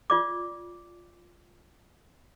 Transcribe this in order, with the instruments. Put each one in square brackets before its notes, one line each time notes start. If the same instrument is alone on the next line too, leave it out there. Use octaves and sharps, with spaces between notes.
[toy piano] F4 D5 D6